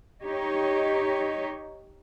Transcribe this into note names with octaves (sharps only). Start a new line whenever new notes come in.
D#4 G4 C#5